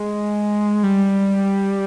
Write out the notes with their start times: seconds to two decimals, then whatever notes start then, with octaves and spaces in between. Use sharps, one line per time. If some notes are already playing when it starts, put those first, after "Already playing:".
Already playing: G#3
0.83 G3